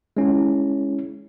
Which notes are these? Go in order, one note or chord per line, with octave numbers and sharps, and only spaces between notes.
G#3 C#4 E4